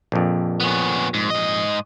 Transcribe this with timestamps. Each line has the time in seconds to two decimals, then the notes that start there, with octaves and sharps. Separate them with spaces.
0.12 A#1 F2
0.60 B3 C#4
1.14 G#2
1.30 G#2 D#5